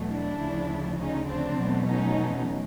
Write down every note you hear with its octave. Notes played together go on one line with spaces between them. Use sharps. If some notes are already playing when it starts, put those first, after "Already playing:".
Already playing: E2 B2 F#3 A3
D4 E4
D2 C#3 F3
C#4 D#4
C4 D4
E2 B2 F#3 A3
C#4 D#4